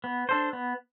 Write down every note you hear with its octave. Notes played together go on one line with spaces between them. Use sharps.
B3
D4 A4 C5
B3